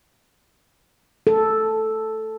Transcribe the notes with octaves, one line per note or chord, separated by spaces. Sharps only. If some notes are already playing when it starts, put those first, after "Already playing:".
A4